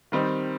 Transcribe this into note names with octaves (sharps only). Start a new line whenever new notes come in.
D#3 G3 C4 D#4